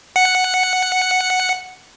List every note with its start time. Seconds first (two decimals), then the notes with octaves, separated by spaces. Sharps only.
0.16 F#5 C#7